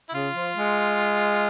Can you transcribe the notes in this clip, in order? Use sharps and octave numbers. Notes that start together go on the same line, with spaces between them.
E4
C#3 F4
F3
G#3